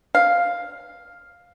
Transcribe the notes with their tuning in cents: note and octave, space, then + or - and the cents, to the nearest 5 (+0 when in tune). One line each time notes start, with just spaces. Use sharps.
F5 +5